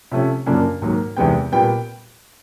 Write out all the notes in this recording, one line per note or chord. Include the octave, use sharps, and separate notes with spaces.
C3 F3 A3 C#4
F#2 C#3 F3 A#3 D4
G#2 D#3 F#3 A#3
E2 C3 D#3 G#3 B3 G5
A#2 G3 B3 G5